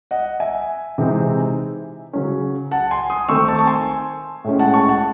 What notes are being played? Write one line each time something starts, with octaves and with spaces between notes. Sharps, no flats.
D#5 F#5
E5 G#5
C3 E3 G#3 C4 D#4
C#3 F#3 C#4
F#5 A5
G#5 C6
C6 D#6
D#3 A3 C4 D#4 C#6 E6
A5 C#6
A5
G#5 C6
A2 G#3 C#4
F#5 A5
A5 C#6
F#5 A5